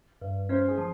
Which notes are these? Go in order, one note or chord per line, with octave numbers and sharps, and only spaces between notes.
G2
C#4 C5
G#4
F3